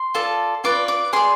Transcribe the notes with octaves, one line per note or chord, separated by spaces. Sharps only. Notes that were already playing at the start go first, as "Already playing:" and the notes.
Already playing: C6
F4 A4 D5
F4 B4 D5 D6
D6
G#4 D5 C6